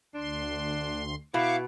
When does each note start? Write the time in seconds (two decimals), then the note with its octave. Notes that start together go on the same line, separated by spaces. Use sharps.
0.15 D2 D4 C6
1.34 B2 E4 F5 C#6 D6